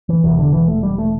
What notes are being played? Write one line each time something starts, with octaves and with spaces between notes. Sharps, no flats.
E3
E1 E2 C3 E3
D3
E3
A3
G3
A3